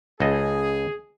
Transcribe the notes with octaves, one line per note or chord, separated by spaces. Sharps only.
C#2 G#4 A4 D#5